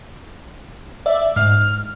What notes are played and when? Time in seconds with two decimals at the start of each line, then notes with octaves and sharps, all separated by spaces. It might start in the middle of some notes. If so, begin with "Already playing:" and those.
1.06 D5 E5
1.36 G#2 F6